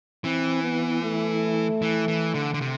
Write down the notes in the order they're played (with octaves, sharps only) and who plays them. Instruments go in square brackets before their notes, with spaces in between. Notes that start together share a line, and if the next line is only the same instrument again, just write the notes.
[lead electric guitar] E3 [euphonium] C4
[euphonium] B3
A3
[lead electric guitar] E3
E3
D3
D3
C3